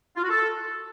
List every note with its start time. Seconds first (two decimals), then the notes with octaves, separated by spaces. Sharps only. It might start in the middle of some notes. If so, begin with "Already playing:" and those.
0.17 F4
0.23 F#4
0.30 A4